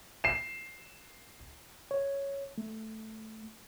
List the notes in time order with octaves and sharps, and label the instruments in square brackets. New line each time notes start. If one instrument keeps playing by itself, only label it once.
[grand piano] C7 E7
[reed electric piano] C#5
A3